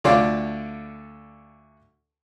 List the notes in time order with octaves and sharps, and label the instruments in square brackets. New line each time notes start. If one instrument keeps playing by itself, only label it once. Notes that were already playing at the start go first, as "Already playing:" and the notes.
[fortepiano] D2 D3 F4 D5 F5